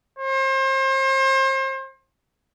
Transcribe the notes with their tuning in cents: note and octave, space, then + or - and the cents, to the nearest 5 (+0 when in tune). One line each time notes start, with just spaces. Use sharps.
C5 +35